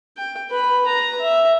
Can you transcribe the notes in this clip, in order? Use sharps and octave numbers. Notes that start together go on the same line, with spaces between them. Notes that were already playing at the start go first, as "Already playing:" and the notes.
G5
B4 B5
B4 A#5
E5